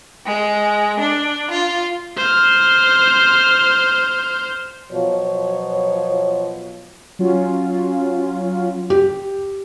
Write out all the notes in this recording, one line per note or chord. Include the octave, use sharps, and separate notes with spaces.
G#3
D4
F4
C5 F6
B2 F3 F#3 C#5
F#3 C#4 F4
G4